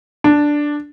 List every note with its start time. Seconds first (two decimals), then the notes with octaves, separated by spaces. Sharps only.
0.24 D4